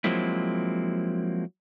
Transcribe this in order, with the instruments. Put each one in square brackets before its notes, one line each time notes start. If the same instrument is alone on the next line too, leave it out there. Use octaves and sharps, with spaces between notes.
[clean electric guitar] F3 F#3 G#3 A#3 C4 E4